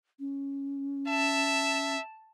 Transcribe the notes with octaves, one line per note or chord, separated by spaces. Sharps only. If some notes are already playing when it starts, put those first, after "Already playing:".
C#4
E5 A5